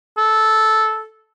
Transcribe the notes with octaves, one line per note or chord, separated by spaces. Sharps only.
A4